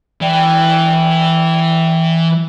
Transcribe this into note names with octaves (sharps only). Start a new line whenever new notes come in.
E3 D5 G5